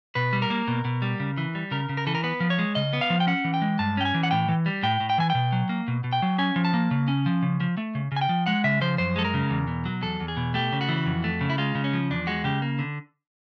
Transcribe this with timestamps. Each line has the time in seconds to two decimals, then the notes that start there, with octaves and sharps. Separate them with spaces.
0.15 B2 B4
0.33 G3
0.42 A#4
0.50 A#3
0.68 B2
0.85 B2
1.02 G3
1.20 C#3
1.38 E3
1.55 G3
1.71 C#3 A#4
1.89 C#3
1.97 A#4
2.07 E3 A4
2.15 A#4
2.24 B3 B4
2.40 F3
2.50 C#5
2.59 G#3
2.75 C#3 D#5
2.93 B3
3.01 F5
3.10 F3
3.20 G5
3.27 C#4 F#5
3.44 E3
3.54 G5
3.62 G#3
3.79 G2 A5
3.97 C#4 G5
4.05 G#5
4.14 E3
4.23 F#5
4.31 A2 G5
4.49 E3
4.66 G3
4.83 A2 G5
5.00 A2
5.10 G5
5.18 E3 G#5
5.30 B2 G5
5.52 F#3
5.69 A#3
5.88 B2
6.04 B2
6.13 G5
6.22 F#3
6.39 C#4 G#5
6.56 F3
6.65 A5
6.74 A#3
6.91 C#3
7.08 C#4
7.26 F3
7.43 C#3
7.60 F3
7.77 A3
7.95 C#3
8.12 C#3 G#5
8.21 G5
8.29 F3
8.46 G#3 F#5
8.64 C#3 E5
8.81 F3 C5
8.98 F#2 C5
9.16 G#3 A4
9.25 A#4
9.34 C#3
9.50 E2
9.68 B2
9.85 F#3
10.02 E2 A4
10.20 E2
10.28 G#4
10.37 B2
10.54 A3 G4
10.72 C#3
10.81 F#4
10.89 E3
11.06 F2
11.24 A3
11.41 C#3
11.50 E4
11.58 G#3 F4
11.75 C#3
11.84 C#4
11.93 F3
12.11 E2 D4
12.27 G#3 F#4
12.44 C#3 G4
12.62 A#3
12.79 D3